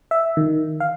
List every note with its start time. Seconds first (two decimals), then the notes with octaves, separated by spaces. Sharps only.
0.11 E5
0.37 D#3
0.80 F5